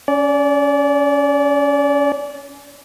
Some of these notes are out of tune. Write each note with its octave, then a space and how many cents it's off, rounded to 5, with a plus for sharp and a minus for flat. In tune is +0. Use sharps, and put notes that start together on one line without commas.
C#4 +20 D5 -25